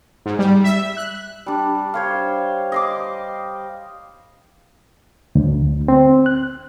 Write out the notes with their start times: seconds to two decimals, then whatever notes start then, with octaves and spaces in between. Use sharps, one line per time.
0.26 G#2
0.39 G3
0.64 E5
0.97 F#6
1.46 G3 D4
1.94 C5 C#5 F5
2.72 D#5 C6 D6
5.35 D2
5.88 C4
6.26 F#6